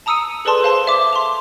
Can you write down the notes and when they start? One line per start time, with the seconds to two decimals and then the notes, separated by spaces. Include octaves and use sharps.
0.06 A5 A#5 D#6 E6 C#7 D#7
0.45 G#4 A4 B4 D5 A5 C6
0.63 C5 F5 A5 C6
0.87 E5 D6
1.13 C6 F7